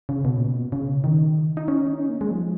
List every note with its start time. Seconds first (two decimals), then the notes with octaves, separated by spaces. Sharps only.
0.09 C#3
0.25 B2
0.37 A#2
0.48 B2
0.72 C#3
1.04 D#3
1.57 D#4
1.68 C#4
1.93 D#4
1.99 C#4
2.09 A#3
2.21 G#3
2.31 F3